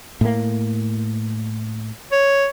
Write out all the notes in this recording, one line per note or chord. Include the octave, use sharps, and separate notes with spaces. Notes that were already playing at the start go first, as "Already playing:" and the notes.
A2 A#3
C#5